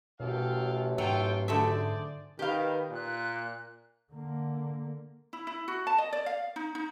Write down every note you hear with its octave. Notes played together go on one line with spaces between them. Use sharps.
A1 F#2 B2 A4 F5 G5
G#2 F#3 F4 A4 G5
D3 A3 G#4 C5 D5 E5
D#3 G4 B4 F5
A#2 F#6
D3 A#3
E4
E4
F#4
A5
D#5
D5
F5
D#4
D#4